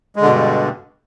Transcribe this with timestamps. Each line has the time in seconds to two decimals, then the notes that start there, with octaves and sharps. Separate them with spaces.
0.16 G#3
0.21 D3
0.26 B2
0.30 G2